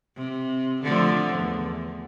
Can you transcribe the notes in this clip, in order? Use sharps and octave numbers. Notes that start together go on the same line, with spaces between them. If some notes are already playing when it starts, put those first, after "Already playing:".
C3
D3 F3 A3
E2